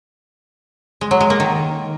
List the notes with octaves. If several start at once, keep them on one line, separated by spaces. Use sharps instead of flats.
G#3
F#3
G#3
A#3
D#3